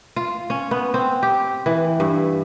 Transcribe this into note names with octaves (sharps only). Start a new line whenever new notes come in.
F4
C#4
B3
C4
G4
E3
G2